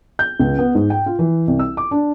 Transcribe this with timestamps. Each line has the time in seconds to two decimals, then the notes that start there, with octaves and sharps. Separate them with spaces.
0.19 G6
0.40 C#2
0.59 B3
0.75 G#2
0.90 G5
1.06 F4
1.19 E3
1.48 C2
1.59 E6
1.77 D6
1.91 D4